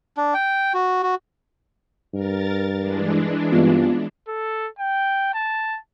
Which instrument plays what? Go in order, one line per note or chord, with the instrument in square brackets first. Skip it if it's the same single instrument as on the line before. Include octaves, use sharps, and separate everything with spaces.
[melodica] D4
G5
F#4
F#4
[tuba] G2 [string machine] A#4 A6
[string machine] E3 G#3 D4
[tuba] G2 [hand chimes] B3 C4 F4
[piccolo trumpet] A4
G5
A5